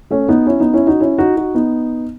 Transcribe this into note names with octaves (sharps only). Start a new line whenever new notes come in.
A3 C#4
B3 D#4
C#4 E4
B3 D#4
C#4 E4
D#4 F#4
C#4 E4
D#4 F#4
D#4 F#4
B3 D#4